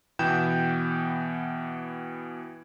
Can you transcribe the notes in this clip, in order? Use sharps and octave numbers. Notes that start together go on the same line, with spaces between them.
B2 E3 B3 G5 G6 E7